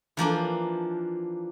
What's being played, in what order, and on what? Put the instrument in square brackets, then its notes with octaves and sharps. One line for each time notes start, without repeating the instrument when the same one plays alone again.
[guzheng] E3 F3 A#3 D4